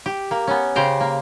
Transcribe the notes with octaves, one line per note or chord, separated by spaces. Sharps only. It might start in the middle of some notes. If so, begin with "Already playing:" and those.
G4
A#3
B3 C#4
C#3 G4 C5 G5 A#5
A#3